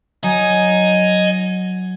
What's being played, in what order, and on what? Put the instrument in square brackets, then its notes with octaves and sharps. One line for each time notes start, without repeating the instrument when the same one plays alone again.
[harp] F#3 [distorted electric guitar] D#5 A#5 [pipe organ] G#5